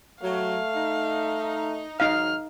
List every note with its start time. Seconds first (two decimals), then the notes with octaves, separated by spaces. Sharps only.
0.23 F#3 A3 F5
0.75 D#4
2.00 G#2 F#3 D#4 F5 F6